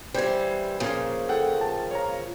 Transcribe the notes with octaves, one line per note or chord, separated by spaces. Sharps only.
E3 G3 C5 G6 G#6
A#2 C#3 F3
A4 F#5 G5
G5 A5
C#5 F5 A#5